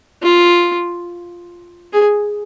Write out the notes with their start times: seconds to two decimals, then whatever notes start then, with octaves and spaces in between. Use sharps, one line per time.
0.23 F4
1.93 G#4